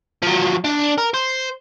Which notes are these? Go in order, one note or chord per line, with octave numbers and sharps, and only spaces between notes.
F3 F#3
D4
A#4
C5